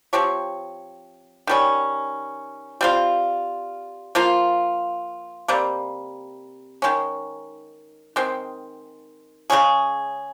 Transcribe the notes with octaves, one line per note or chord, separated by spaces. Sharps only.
F3 C4 G4 C#5
D#3 G3 C#4
G3 C4 F4
F3 A#3 F4
C3 G3 A#3
D#3 G#3 C#4
D#3 G#3 C4
C#3 G#3 C#4 G#4